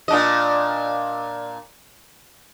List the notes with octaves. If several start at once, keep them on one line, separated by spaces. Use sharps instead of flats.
A#2 D4 D#5